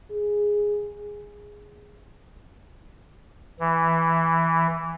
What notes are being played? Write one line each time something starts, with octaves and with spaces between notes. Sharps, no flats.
G#4
E3